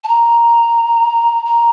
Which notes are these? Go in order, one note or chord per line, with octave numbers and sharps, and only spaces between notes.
A5
A#5
A#5